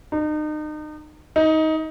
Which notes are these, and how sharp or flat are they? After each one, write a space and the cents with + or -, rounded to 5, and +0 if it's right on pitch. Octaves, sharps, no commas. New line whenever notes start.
D#4 -35
D#4 +20